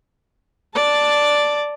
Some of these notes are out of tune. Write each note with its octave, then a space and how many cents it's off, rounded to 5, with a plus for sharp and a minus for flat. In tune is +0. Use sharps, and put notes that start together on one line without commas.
D5 +0 A5 +0